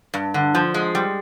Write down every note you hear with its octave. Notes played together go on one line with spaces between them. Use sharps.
G2
D3
F3
G#3
G3